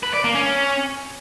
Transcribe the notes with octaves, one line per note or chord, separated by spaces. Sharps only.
B4
D5
A#3
C#4